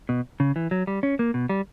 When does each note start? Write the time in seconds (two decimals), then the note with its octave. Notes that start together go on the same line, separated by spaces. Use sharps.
0.09 B2
0.40 C#3
0.56 E3
0.71 F#3
0.87 G3
1.03 C#4
1.19 A#3
1.34 B2
1.49 G3